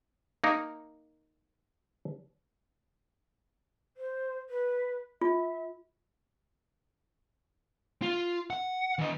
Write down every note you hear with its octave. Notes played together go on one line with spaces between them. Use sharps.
A#3 D#4 A#4
C5
B4
F4 E5
F4
F#5
E3 D#5